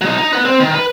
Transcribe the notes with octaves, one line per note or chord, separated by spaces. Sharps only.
F#3 D#4
D#4
B4 F#5
C4
D#3
B4